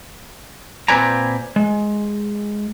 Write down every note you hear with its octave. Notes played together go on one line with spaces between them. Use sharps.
A#2 C4 B4 D5 G#5 A#5
G#3